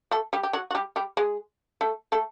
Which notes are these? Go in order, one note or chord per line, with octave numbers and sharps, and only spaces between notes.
A3 A4
G3 G4
G4
F#3 F#4
F#4
G3 G4
G3 G4
G#3 G#4
A3 A4
A3 A4